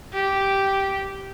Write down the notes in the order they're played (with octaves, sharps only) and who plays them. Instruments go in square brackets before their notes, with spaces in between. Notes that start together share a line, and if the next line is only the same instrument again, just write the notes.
[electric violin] G4